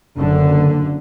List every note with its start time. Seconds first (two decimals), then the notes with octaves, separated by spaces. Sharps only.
0.18 F#1 D3